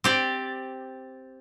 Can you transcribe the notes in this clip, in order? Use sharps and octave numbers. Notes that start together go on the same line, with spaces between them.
C4 G4 D5